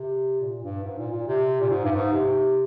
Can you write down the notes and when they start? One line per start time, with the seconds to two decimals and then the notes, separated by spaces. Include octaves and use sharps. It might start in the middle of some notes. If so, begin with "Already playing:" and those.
Already playing: C3
0.41 A#2
0.63 G2
0.84 G#2
0.98 A#2
1.12 A#2
1.27 C3
1.61 A#2
1.70 G#2
1.84 G2
1.91 G#2
2.12 C3